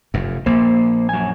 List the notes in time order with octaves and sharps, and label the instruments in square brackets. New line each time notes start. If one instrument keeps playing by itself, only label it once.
[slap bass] F1 F#2
[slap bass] A#1 [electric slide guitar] A#3 C5
[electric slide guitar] F#2 G#5